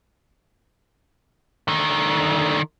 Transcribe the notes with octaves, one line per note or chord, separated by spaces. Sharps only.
D3 D#3